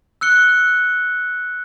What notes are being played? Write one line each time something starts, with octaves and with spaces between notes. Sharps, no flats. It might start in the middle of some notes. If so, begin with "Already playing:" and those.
E6 F#6 C#7 G7